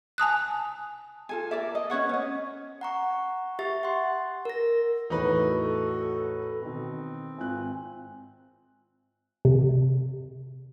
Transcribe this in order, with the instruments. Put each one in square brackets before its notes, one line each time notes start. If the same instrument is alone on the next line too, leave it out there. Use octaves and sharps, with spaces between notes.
[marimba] G#5 A5 D#6 F#6
[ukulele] F4 A4 G#5
A#4 D5 E5
D#5
C#4 B4 C#5 F#5
C#4 D#5
[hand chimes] F#5 A#5 C#6
G4 E5 C#6 A6
F#5 C6
A#4 A#6
[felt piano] E2 A2 E3 [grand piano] D#4 B4 [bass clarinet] F#4 [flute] A4
[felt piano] B2 D#3 [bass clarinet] C4
[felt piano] G#1 F4 F#6 [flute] G#5
[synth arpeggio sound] C3